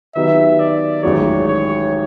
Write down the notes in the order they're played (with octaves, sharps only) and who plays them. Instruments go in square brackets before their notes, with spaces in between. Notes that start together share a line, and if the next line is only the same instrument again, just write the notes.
[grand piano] D#3 F#3 B3 D#4 G4 [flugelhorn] E5
[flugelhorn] D5
[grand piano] A1 G#2 D#3 F#3 [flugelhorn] C#5
[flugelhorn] C#5